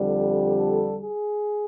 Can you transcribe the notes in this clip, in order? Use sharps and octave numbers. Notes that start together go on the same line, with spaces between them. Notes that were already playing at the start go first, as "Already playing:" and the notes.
Already playing: F2 D3 G3
A4
G#4